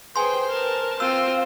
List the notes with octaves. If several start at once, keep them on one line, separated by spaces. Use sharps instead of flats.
G#4 B4 C5 G5 G#5 C6
A#4 A5
C4 F4 C5 F5 E6